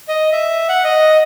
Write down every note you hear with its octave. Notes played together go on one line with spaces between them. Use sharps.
D#5
E5
F#5
D#5